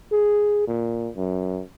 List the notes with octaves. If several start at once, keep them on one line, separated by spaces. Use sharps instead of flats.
G#4
A#2
F#2